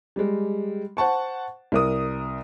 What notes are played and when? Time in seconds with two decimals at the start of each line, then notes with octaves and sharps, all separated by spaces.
0.16 G3 G#3
0.97 C5 F#5 A5 C#6
1.72 C2 A#4 D#6